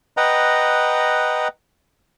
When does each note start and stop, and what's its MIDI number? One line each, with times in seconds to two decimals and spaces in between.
0.17 1.48 71
0.17 1.48 75
0.17 1.48 78
0.17 1.48 79
0.17 1.48 82